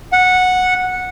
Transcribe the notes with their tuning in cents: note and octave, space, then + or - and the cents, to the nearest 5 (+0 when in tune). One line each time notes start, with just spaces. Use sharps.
F#5 -10